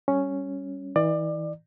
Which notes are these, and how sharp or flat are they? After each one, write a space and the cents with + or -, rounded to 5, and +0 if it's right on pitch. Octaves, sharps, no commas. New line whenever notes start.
G3 +0 C#4 +0
E3 -35 D5 +25